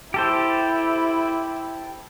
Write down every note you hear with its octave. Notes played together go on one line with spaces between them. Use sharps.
E4 G4 A4 C5